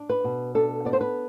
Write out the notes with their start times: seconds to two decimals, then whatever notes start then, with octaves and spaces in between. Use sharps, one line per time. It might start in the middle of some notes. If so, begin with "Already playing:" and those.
Already playing: D4
0.09 B4
0.24 B2
0.55 D4 A4
0.85 B3 D5
0.93 C5
1.01 B4